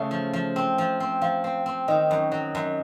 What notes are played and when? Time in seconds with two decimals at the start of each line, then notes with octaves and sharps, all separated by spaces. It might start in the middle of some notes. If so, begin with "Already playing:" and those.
Already playing: C#3 A3 E5
0.11 F3
0.33 F3
0.56 C4
0.78 F3
1.00 C4
1.21 F3 F5
1.44 C4
1.66 C4
1.88 D#3 D#5
2.11 F#2
2.32 F#3
2.55 F#2